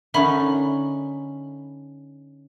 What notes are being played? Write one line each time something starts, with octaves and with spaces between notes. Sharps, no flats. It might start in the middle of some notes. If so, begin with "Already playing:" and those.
D3 C#4 D#4 A#4 E5 B5